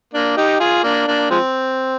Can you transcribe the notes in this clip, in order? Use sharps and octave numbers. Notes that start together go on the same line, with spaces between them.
A#3 D4
D#4 G4
F4 G#4
A#3 D4
A#3 D4
F3 G#3 C4